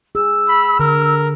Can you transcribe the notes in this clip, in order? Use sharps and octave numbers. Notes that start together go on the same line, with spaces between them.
G#4 E6
B5
D3 A#4